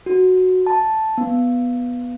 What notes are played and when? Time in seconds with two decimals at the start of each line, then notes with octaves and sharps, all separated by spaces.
0.06 F#4
0.67 A5
1.18 B3